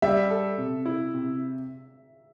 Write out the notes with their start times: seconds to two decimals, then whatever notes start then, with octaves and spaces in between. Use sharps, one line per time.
0.02 G3 E5
0.30 A4
0.58 C3
0.85 E4
1.14 C3